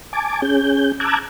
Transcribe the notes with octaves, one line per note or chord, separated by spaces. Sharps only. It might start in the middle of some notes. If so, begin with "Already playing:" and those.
G#5 A5 D6
C#4 G#4 G6
A5 A#5 D6 E6 F#6 G#6